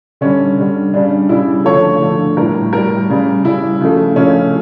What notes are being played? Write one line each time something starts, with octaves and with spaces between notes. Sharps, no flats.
D3 G3 C#4
D3 G3
C#3 G3 D4
C#3 G3 E4
D3 F3 A3 C#5
D3 F3 A3
A2 G3 A#4
A2 G3 A#4
C#3 G3
C#3 G3 E4
C#3 F3 A3
C#3 F3 A3 C#4